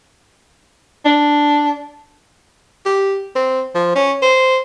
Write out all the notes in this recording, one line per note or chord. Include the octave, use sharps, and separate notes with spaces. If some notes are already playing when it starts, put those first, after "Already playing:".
D4
G4
C4
F3
C#4
C5